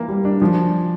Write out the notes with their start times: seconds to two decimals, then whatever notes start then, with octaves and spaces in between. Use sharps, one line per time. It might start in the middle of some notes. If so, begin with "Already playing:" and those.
Already playing: E3 A#3
0.09 G3
0.25 D4
0.42 F3